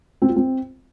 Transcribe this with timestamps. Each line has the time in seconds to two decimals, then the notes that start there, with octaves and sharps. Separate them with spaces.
0.22 C4
0.29 F4
0.36 C4